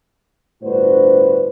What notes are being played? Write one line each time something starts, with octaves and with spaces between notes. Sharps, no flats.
G1 A2 D4 F#4 B4 C5